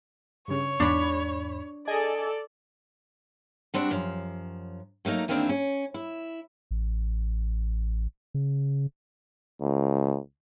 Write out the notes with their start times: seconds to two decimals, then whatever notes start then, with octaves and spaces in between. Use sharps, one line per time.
0.48 G2 C#3 C#5
0.80 E2 G#2 D4 B5
1.87 G#4 A4 D5 D#5 G#5
3.74 G3 C4 D4 F#4 D5
3.91 F#2 F3
5.05 F#3 A3 A#3 D#4
5.28 E2 D#3 A#3 C4 D4 E4
5.49 C#4
5.94 E4
6.71 A1
8.34 C#3
9.61 C#2